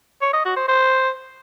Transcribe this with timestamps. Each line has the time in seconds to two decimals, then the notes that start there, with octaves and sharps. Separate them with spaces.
0.22 C#5
0.33 D#5
0.45 F#4
0.57 C5
0.68 C5